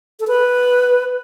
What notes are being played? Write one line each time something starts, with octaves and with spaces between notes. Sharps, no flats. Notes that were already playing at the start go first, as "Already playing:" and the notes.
A4
B4